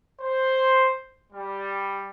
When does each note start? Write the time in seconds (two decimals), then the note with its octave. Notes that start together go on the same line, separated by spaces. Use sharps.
0.21 C5
1.33 G3